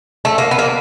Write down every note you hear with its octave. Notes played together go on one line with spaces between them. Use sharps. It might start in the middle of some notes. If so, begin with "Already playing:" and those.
A3
A#3
B3
A#3